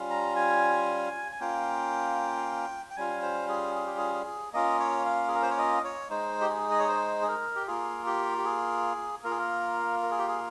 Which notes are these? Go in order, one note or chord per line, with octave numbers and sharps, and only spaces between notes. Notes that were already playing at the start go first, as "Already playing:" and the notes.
Already playing: G3 C#4 F4
A#5
G#5
G#5
A#3 C#4 F4 G5
G5
G3 C#4 F4 G#5
C5
G#4
G#4
G4
G#4
G#4
A#3 C#4 F4 D#5
C#5
F5
G#4
A#4
C5
C#5
D#5
C#5
G#3 D#4 C5
G4
G#4
D#5
C#5
C5
G#4
A#4
G4
A#3 F4 G#4
G4
G4
G#4
A#3 F4 A#4
G#4
A#4
A#4
G#4
G4
G#4